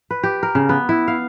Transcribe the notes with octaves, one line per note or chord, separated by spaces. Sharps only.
B4
G4
A#4
C#3
B3
E4
F5